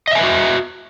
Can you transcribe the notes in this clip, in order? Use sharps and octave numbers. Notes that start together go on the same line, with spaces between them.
F#4 B4 D#5 E5 G#5